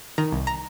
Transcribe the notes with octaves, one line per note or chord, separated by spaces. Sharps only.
D#3 A#5
C2
A#5